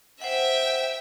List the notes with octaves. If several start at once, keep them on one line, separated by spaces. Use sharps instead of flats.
C5 E5 F#5 G5